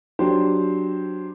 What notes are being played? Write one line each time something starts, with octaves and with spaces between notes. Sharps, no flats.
F#3 D4 G4 C5